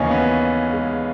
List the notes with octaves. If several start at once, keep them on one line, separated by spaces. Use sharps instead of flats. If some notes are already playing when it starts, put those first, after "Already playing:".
Already playing: D#2 C#3 E3 C#4 D#4
B3
G#3